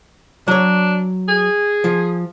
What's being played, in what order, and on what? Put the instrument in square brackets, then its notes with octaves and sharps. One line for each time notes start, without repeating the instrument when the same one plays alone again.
[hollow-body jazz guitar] F#3 C#5 [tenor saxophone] D4
[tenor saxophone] G#4
[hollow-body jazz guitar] F3